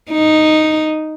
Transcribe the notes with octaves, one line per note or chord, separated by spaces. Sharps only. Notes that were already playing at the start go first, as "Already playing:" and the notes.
D#4